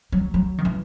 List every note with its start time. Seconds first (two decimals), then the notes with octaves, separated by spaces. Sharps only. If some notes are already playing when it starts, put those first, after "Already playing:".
0.12 F#3
0.34 F#3
0.58 D#3
0.65 E3